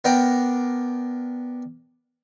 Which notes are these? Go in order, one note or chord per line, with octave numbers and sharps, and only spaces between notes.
B3 D4 A#4 G5